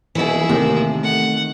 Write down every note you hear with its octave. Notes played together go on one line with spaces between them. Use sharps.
D#1 B2 E3 E4 G#4
D#2 A2 C3 D#3
A3 F#5